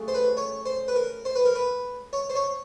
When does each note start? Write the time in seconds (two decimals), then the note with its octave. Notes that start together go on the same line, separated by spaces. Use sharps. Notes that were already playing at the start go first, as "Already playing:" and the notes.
Already playing: C#3 F#3 A3
0.08 C5
0.14 B4
0.37 C#5
0.66 C5
0.88 B4
0.96 A#4
1.25 C5
1.36 B4
1.45 A#4
1.55 B4
2.13 C#5
2.30 C5
2.35 C#5